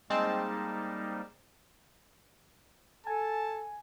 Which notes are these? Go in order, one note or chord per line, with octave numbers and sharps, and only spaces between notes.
G3 G#3 A#3 C4 D#4 A5
A4 G#5 A5